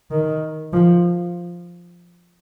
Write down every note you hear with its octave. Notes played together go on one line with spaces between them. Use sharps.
D#3
F3